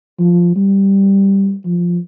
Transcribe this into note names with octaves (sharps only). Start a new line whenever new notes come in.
F3
G3
F3